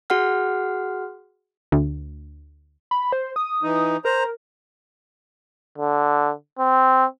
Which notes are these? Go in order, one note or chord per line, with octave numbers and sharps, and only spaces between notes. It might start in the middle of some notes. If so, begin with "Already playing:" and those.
F#4 G#4 F#5 F6
D2
B5
C5
D#6
E3 D#4
A#4 C5 A#5
D3
C4